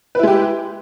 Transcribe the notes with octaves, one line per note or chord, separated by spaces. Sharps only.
G#3 E4 G4 B4